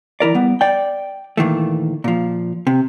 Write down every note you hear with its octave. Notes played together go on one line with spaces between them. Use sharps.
E3 E4 A#4 D5
G3 B3
D5 G5
A#2 D#3 E3 A3
A#2 F3
C3